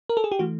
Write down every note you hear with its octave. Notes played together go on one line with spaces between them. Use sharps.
A#4
A4
G#4
G4
E3 A3 F#4